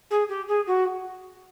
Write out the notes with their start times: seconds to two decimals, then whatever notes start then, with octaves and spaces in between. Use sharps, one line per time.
0.10 G#4
0.29 G4
0.48 G#4
0.67 F#4